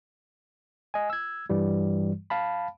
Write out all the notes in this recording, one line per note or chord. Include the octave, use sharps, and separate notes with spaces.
D#5 G#5
E6 G#6
G2 E3 G3
F5 A5 B5